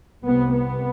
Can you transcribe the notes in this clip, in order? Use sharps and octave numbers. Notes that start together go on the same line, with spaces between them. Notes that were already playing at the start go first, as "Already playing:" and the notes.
C2 C3 B3
B3